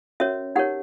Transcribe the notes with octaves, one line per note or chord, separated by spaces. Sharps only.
C#4 F#4 A#4 C#5 E5
D#4 G4 A#4 C#5 F#5